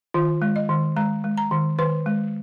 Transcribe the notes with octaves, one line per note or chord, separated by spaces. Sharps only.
D#3 F4
G#3
D#5
D#3
G#3 A#5
G#3
A#5
D#3
D#3 B4
G#3